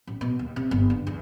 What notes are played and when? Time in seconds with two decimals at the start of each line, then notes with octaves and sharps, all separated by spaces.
0.07 A1
0.21 B2
0.39 D#2
0.56 C3
0.71 G1
0.90 D3
1.07 E2